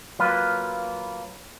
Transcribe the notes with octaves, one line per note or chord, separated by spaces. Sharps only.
F#3 A#3 F4 B4